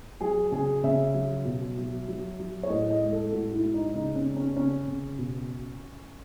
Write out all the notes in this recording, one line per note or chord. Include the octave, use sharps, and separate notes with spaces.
F#3 G#4
C#3 G#4
C#3 E5
F#3
B2
F#3
F#3
F#3
C#5
A2 D#5
D#5
G#3
A4
A2 F#4
E4
G#3
D#4
C#3 D#4
C#4
C#3
C#4
C#3 C#4
C#3
B2